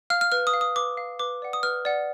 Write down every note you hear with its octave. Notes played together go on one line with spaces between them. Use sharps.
F5 F6
F6
B4 F6
D#6
F5
D#6
B4 D6
F5
B4 D6
D5 F#5
D#6
B4 F6
D5 F#5